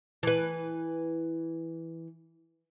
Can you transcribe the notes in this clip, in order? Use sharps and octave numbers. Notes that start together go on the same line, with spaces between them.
E3 B4